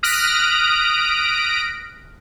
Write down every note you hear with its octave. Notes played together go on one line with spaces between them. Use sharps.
D#6 F6 F#6 A#6 B6 D7